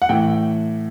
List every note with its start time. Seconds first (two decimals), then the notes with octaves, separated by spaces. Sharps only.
0.02 F#5
0.09 A2 E3 G5